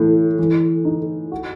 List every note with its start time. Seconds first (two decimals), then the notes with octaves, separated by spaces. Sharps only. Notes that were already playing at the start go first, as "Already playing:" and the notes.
Already playing: A2 E3
0.39 E3
0.85 D#4
1.32 F#4